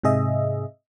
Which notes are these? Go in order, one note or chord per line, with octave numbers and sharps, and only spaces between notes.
G#2 C3 G#4 D#5 E5